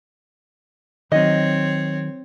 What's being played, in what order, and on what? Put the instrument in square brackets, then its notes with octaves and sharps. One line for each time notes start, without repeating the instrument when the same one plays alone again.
[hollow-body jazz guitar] D#3 F#3 [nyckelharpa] C4 C#5 [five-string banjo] D#5